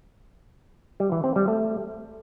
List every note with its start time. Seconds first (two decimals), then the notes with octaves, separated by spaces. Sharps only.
1.00 G3
1.12 E3
1.24 C4
1.36 G3
1.48 A3